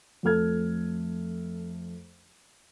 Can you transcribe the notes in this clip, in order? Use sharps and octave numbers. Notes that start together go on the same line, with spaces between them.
F2 A3 A4 F6 G#6